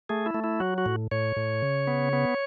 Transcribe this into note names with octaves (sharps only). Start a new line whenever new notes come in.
A3 G#4
E4
A3
E4
F#3 F#4
F#4
A2
A2 C#5
A2
C#3
B3
B3